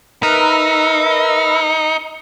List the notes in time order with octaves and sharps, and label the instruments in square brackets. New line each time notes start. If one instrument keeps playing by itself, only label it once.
[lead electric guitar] D#4 [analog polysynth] A#4 B4 E5